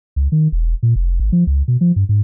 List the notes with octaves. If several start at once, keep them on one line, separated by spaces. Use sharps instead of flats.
C#2
D#3
E1
A#2
F1
G#1
F3
C#2
B2
F3
G2
G#2